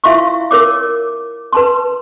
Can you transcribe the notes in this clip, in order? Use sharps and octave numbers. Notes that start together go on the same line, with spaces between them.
E4 F4 E5 F5 C6 C#6
A#4 C#5 D6
B4 A5 C6